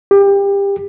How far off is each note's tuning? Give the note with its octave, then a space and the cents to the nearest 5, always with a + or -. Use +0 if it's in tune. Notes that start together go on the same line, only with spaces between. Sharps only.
G4 +25